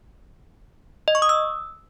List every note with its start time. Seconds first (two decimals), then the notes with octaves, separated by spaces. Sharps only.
1.08 D#5
1.15 C#6
1.22 D#6
1.29 E6